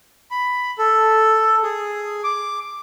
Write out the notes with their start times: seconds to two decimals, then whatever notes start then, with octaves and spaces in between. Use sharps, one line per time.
0.31 B5
0.79 A4
1.63 G#4
2.24 D6